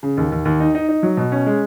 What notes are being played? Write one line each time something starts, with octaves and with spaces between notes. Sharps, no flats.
C#3
D#2
D#2
D#2
D#4
D#4
D#4
F#3
B2
C#4
G#3